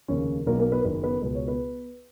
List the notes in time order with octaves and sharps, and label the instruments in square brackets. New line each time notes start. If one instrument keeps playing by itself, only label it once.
[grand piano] F1 D#2 C#3 C#4 C#5
B1 B2 A#3 A#4
A#3 A#4
B3 B4
A#4
F#1 F#2 D#3 B3 B4
B3 B4
C#2 B2 B4
C#5
B3 B4